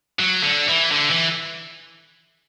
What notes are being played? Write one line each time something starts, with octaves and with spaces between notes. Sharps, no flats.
F#3
D3
E3
D3
E3